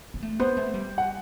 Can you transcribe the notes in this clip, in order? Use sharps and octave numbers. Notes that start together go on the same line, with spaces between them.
B3
A3
B3 C5
A3
G3
F#5